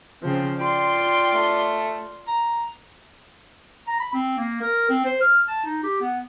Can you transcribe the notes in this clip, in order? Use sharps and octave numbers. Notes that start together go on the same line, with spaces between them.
C#3 F3 C4
F4 D5 G5 C6
A3
A#5
A#5
B5
C4
A#3
A#4
C4
C5
F6
A5
D#4
G4
B3